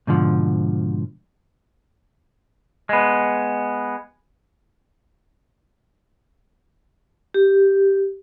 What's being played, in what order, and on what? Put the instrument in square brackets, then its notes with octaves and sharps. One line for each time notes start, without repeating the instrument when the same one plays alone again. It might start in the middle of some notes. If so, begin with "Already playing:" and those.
[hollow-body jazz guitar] G#2 B2 D3 F3
[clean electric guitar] G#3 B3
[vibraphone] G4